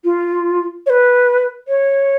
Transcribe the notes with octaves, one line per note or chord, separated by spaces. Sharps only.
F4
C#5
B4
C#5